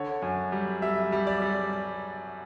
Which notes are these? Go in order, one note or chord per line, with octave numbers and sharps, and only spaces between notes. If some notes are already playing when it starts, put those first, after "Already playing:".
Already playing: D3 C#5
F#2
G3
G3 E5
G3
D5
G3